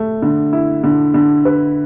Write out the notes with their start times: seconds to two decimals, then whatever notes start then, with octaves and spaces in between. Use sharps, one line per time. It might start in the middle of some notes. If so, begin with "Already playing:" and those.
Already playing: A3
0.22 D3
0.53 E4
0.84 D3
1.14 D3
1.45 B4